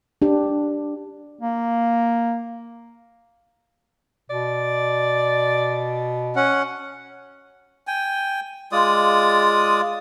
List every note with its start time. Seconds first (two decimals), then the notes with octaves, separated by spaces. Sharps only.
0.22 D4 G4
1.41 A#3
4.30 B2 D5
6.36 C#4 F#5
7.87 G5 G#5
8.72 G#3 F4 D5 D#6